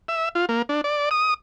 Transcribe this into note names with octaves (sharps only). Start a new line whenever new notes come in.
E5
F4
A#3
D4
D5
D#6